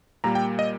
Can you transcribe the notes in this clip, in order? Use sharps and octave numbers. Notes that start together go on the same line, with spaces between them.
A#2 G3 A#3 A#5
G5
D#5